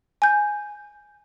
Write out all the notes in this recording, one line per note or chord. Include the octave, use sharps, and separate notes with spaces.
G#5 G6